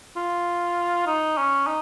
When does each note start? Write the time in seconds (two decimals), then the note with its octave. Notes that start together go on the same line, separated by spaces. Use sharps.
0.16 F4
1.07 D#4
1.37 C#4
1.67 D#4